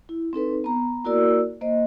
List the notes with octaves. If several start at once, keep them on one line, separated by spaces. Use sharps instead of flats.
E4
C4 D#4 A4 B4
B3 A#5
A#3 E4 F#4 A#4 D5 E6
A#3 C5 D#5